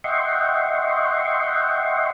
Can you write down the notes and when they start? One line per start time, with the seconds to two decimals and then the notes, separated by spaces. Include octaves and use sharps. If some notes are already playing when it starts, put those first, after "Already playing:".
0.04 D#5 E5 F#5 G5 C6 C#6